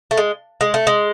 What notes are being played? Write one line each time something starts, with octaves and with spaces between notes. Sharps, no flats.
A3
G#3
G#3
A3
G#3